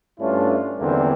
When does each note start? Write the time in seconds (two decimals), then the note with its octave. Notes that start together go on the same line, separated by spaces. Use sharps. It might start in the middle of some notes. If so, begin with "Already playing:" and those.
0.19 G2 A3 C#4 D4 E4 F4
0.80 E2 D3 D#3 G3 A#3 C4